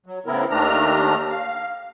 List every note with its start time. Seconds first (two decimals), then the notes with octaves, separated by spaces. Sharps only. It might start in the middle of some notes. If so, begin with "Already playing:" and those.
0.06 F#3
0.26 A2 C#3 B3 C4 E4 A#4
0.50 D#2 D#3 A3 D4 A#5 F6
1.29 F5